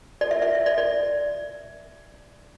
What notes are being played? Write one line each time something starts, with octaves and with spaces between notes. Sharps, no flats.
D5
E5
E5
E5
D5
D5